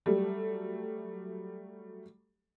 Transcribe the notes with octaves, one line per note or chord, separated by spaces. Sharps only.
F#3 G3 A3